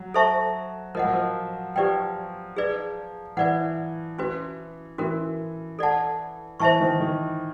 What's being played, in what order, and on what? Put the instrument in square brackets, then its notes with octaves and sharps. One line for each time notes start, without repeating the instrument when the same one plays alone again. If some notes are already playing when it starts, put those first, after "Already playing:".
Already playing: [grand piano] F#3
[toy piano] A4 C5 E5 A5 C#6
[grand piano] F3 [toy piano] A#4 D#5 F#5
[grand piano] F#3
F3
[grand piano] F3 [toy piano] G4 B4 D5 G5
[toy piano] G#4 B4 D5
[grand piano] E3 [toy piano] B4 D5 F#5
[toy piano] C#4 F#4 B4
[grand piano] E3 [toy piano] C#4 F#4 A#4
[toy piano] A4 D5 F#5 A5
[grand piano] E3 [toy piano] C5 E5 A5 C#6
[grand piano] D#3
D#3